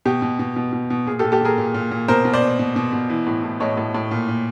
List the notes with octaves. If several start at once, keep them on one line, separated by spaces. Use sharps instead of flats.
B2 G4
B2
B2
B2
B2
B2
A#2 G#4
G4 A4
A#2
G4 A4
A#2 G#4 A#4
A#2
A#2
A#2
B2 A#4 C5
B2
C5 D5
B2
B2
B2
B2
E3
A2
A2
A2 C#5 D#5
A2
A2
A#2
A#2